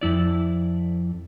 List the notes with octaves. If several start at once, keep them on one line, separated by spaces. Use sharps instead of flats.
F2 E4 D5